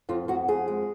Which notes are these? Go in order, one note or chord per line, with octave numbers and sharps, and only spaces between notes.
F2 F4
F2 F#4
F2 G#4
G#3